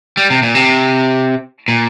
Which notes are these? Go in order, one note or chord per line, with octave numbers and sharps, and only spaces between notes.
G3
C3
A#2
C3
A#2